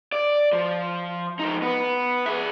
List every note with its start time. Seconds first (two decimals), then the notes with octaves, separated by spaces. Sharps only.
0.12 D5
0.53 F3
1.39 F3 D#4
1.62 B3
2.26 G#4 E5